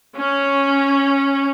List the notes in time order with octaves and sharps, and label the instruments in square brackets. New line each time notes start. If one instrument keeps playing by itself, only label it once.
[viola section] C#4